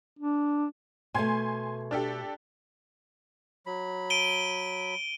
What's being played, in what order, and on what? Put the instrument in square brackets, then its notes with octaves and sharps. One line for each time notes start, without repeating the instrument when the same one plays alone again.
[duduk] D4
[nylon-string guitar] B2 A3 [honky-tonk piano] G#5 C6 G#6
[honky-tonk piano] D4 G4 A4
[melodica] F#3 B5
[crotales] D7 D#7 G7